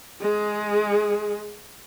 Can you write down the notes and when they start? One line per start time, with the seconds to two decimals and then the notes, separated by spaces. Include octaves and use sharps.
0.21 G#3 G#4